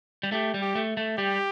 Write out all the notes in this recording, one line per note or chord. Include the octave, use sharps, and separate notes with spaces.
G3
A3 G4
G3
G4
A3
A3
G3 G4